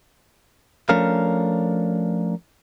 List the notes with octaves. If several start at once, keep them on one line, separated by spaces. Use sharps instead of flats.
F3 A3 C#4 D4 A#4 F5